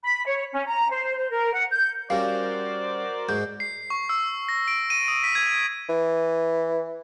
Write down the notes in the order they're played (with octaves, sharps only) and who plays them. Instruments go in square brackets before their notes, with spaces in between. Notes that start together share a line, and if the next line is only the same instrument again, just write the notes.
[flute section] B5
C#5
C#4
A#5
C5
C5
A#4
F#5
G6
[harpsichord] G3 C#4 [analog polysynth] F#4 A#4 C5 [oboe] D5 [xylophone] F5
[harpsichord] G#2 G#3 [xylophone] G6
[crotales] C7
C#6
E6
A#6
D7
D#7
D#6
B6
G#6
[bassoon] E3